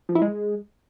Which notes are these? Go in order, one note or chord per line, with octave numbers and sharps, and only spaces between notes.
F3
E4
G#3